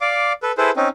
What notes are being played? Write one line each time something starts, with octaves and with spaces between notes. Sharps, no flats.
D5 F5 D6
A4 B4
E4 G#4 A4 B4 C5
C4 C#4 D#4